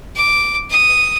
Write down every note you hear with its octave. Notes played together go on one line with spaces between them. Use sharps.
D6
D#6